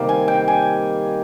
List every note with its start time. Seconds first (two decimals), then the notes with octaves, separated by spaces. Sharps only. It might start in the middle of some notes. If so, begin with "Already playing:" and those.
Already playing: C3 D#3 G3 A#3
0.09 G#5
0.28 G5
0.48 G#5